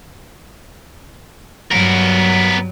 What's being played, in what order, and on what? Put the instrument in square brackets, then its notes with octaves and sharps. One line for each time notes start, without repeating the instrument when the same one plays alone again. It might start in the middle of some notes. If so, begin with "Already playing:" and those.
[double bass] G2 F#3 [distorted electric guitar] B3 A#4